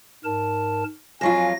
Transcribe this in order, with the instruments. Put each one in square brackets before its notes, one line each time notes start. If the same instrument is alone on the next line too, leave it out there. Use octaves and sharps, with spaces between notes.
[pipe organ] G#2 A#4 A5
[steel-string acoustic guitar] F2 F#3 F4 [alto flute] G#5 [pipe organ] A#6